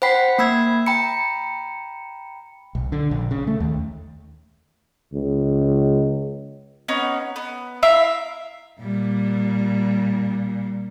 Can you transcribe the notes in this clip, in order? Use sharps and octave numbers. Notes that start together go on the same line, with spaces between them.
C5 F#5 G5 B5 B6 C7
A#3 B5 E6 G#6
G5 A#5 B5 C#7
B1
D3
A#1
C#3
A3
D#2
C#2
B3 C#4 D#4
B3
E4 E5 F5 A#5
A#2 G3